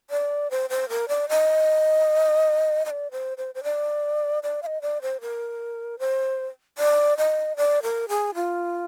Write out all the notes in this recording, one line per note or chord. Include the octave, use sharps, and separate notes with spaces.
D5
C5
C5
A#4
D5
D#5
D#5
D5
C5
C5
C5
D5
D5
F5
D#5
D5
C5
A#4
C5
D5
D#5
D5
A#4
G#4
F4